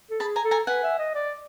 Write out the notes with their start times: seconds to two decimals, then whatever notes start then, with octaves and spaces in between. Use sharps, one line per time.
0.10 A4
0.20 G#4 A5 B5
0.36 G#5 A#5
0.44 A4
0.51 G#5 A#5
0.67 B4 F#5 G#5
0.83 E5
0.99 D#5
1.15 D5